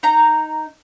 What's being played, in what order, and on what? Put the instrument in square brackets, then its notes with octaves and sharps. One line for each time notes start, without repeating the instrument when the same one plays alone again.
[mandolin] D#4 A#5